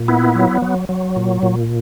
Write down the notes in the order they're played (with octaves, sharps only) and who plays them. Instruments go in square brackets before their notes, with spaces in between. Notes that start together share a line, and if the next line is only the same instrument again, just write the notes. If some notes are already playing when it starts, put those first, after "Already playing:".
Already playing: [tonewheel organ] A#2
B3 E4
F#3
F#3
F#3
A#2
A#2